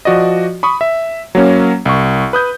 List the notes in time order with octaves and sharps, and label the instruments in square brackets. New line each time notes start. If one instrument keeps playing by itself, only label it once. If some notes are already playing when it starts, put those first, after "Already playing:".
[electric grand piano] F3 F#4 D5 D#5
B5 C#6 D#6
E5
F#3 A#3 C#4
C2 C#6
B4 D#6 G6